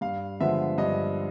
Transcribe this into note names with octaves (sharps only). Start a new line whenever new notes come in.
G2 F5
D3 F3 G#3 B3 E5
G2 D#5